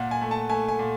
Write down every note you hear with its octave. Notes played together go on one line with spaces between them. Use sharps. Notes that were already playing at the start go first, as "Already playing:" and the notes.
Already playing: A#2 F#5
G#5
A3
A5
A3 G#5
G#5
A#2